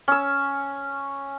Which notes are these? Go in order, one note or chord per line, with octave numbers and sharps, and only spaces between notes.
C#4 E6